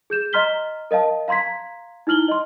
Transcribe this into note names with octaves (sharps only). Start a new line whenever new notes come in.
G#4 G6 E7
D#5 A#5 C6 F6 B6 G7
A#4 D#5 F5 A5
F5 A#5 C6 G#6 B6
D#4 E4 F6 F#7 G7
D#5 C6